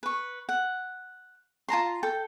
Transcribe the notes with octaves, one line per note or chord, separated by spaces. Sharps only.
B4 C#6
F#5
F4 A5 A#5 C6
A4 G5